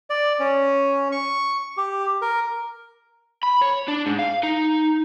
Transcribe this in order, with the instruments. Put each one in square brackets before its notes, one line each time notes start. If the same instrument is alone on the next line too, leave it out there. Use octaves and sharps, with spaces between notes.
[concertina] D5
C#4
C#6
G4
A#4
[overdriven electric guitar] B5
C#5
D4
G#2
F5
D#4